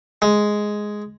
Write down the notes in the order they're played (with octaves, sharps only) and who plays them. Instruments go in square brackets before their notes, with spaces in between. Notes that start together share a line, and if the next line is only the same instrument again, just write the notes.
[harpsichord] G#3